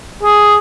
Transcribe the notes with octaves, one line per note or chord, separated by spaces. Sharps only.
G#4